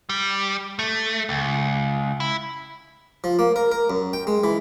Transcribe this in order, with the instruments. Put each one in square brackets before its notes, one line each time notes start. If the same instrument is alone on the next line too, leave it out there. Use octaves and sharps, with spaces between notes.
[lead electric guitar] G3
A3
C#2
E4
[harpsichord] F3
A#3
A#4
A#4
F#2
G5
G#3
E3